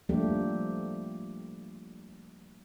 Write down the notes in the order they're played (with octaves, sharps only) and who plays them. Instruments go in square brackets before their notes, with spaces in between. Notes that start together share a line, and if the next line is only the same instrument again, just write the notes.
[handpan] F3 G3 A3 A#3 D4 G4